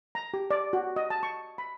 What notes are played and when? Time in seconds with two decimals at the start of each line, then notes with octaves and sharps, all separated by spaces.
0.15 A#5
0.34 G4
0.51 D5
0.73 F#4
0.96 D#5
1.10 A5
1.23 C#6
1.58 B5